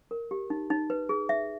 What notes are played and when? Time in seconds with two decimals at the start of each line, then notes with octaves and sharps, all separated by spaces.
0.11 A#4
0.31 G4
0.50 D#4
0.70 D#4
0.90 B4
1.09 G#4
1.29 E5